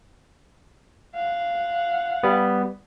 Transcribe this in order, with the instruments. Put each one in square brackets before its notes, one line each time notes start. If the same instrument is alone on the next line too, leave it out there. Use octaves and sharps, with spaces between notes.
[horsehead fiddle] F5 F#5
[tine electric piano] G3 B3